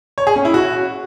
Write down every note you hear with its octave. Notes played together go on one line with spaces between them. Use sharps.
C#5
G#4
C#4
E4
F#4